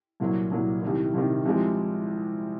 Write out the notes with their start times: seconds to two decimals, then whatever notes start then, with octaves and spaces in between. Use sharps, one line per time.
0.20 C2 A#2 F#3 A#3
0.51 C2 A#2 F#3 A#3
0.82 C2 C3 D#3
1.14 C2 C3 D#3
1.45 C2 C3 F3 G#3 D#4